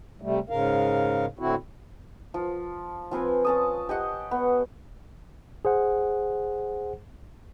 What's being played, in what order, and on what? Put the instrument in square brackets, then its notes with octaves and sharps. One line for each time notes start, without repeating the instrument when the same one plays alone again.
[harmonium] C3 G3 A3
G#2 C#3 A#4 F5
A2 D3 C4 E4 F#4
[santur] F3
F3 C4 B4 G#5
C#4 A5 D#6
G4 D#5 F#5
B3
[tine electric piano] G#4 C5 F#5